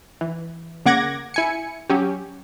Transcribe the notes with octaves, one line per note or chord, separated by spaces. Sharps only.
E3
C#3 A#3 F#5 D6 G#6 A#6
E4 G#5 C#7
F#3 C#4 G4